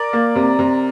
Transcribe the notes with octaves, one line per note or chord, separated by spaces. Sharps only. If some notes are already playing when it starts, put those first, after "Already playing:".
Already playing: A#4 D5
A#3
C3
C3